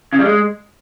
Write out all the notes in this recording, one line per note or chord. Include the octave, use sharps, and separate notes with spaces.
C#3
G3
G#3